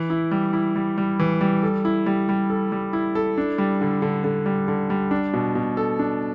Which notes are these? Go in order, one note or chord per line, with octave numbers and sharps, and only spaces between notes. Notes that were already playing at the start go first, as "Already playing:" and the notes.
Already playing: E3
E4
G3
E4
G3
G3
E3
G3
A4
E4
G3
G3
A4
G3
E4
A4
D4
G3
D3
D3
D3
G3
D3
G3
D4
B2
B2
A4
D4